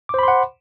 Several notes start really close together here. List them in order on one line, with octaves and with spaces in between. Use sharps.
D6 C5 B5 C6 F#5